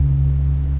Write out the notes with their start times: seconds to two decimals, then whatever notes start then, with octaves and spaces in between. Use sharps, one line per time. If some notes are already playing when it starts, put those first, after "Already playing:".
Already playing: C#2 C#3